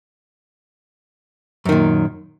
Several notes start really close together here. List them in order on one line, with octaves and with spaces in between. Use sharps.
F#2 D#3 A#2